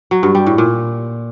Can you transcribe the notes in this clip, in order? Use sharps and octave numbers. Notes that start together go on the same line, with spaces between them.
F#3
G2
G3
A2
A#2